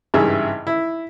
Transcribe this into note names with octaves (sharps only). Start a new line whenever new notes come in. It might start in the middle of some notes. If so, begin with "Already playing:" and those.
G#1 G2 C#3 E3 G#4 E5
E4